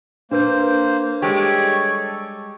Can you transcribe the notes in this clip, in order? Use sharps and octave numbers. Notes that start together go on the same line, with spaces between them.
A#3 D4 B4 C5 G6
G3 G#3 G4 A4 C#5